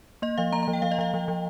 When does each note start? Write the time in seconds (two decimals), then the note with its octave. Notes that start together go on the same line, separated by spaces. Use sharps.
0.22 A#3 D#5
0.38 F3 F5
0.52 A#3 A#5
0.63 F3 A#5
0.73 G5
0.82 F3 F5
0.91 D#5
0.98 F3 F5
1.14 F3
1.28 F3